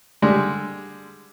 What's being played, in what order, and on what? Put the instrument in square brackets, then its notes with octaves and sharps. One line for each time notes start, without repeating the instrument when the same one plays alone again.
[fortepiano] D3 G3 G#3